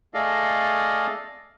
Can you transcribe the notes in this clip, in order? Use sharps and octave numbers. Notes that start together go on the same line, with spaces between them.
A3 G#4 A4 D5 D#5 F5